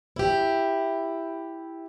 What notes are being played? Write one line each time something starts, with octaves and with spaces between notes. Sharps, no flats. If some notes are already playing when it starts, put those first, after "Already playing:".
E4 G4